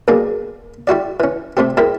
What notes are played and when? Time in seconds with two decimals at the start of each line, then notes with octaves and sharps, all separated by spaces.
0.08 B1 G2 A#3 G#4
0.87 G3 E4 F#4 D5
1.20 E3 C#4
1.57 C3 A3 C4 G4
1.77 E2 G#2 E4 G4 A#4 B5